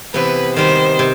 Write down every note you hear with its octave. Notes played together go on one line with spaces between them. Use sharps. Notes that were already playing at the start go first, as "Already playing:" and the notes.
C3 E3 B3 B4
D#3 G3 D#4 C5
C3